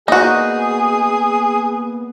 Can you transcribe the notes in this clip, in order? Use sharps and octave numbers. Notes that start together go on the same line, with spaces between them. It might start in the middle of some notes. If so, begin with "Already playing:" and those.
A#3 B3 D#4 F#4 G#4 D5